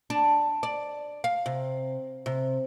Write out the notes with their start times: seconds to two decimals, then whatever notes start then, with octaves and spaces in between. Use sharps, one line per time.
0.10 D4
0.63 D5
1.24 F5
1.46 C3
2.26 C3